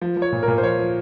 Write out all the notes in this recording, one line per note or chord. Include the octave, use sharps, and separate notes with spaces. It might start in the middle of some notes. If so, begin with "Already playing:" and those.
F3
F3
C#5
A#2
A#4
A#2
C5
F3 C#5
F3